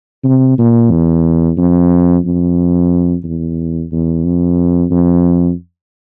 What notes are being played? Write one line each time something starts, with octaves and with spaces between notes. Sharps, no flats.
C3
A#2
E2
F2
F2
E2
E2
F2
F2